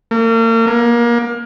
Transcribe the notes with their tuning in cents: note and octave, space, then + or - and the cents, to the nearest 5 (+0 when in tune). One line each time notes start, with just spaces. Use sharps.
A#3 -40
A#3 +25